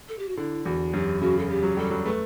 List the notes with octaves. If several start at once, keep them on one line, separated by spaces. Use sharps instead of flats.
A4
G4
F#4
D3 E4
E2 F#4
F#2 G4
C#3 F#4
A4
G4
F#3
G3 A4
F#3
A3 B4